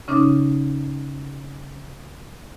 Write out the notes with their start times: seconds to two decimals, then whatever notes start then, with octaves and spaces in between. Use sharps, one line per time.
0.08 C#3 C#4 D#4 D6 D#6